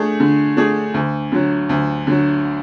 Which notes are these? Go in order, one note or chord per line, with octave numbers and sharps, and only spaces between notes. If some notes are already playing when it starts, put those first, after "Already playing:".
Already playing: A3 D4 G#4
D3
A3 D4 G#4
D2
D3 F#3
D2
D3 F#3